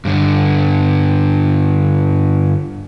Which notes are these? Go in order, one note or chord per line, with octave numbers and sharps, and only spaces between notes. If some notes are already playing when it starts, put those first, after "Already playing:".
G2 D3